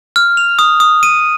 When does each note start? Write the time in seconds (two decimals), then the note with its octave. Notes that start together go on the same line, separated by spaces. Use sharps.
0.16 F6
0.37 F7
0.59 D#6
0.80 D#6
1.03 D#7